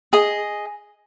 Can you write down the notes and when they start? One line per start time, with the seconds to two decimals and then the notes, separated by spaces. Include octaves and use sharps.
0.13 G#4 D#5